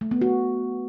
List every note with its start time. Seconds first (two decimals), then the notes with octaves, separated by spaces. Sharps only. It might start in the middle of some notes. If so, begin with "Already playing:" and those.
0.01 A3
0.11 B3
0.21 F#4